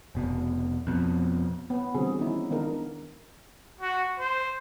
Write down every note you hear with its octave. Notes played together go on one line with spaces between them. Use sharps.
F1 B2
F2 B2
B3
D3 E3 G3 C4 F#4 G#4
D#3 B3 C#4 D#4 E4
D#3 G#3 B3 D4 D#4 A#4
F#4
C5